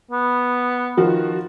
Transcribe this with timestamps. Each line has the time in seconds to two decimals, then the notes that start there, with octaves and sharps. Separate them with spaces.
0.11 B3
0.97 D#3 F3 F#4